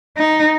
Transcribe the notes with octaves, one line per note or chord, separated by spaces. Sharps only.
D#4